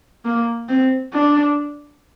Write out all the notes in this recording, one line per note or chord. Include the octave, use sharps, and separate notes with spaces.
A#3
C4
D4